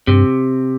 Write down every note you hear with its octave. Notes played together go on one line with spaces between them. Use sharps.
G2 C3